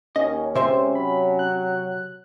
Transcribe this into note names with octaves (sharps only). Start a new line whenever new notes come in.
D#2 C#4 D#5
C#2 C3 C5 E5 C6
F#3 B5
F#6